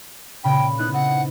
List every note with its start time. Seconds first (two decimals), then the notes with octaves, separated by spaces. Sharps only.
0.44 A#2 C#3 G5 B5
0.79 B3 D#4 E4 F#6
0.94 C4 F#5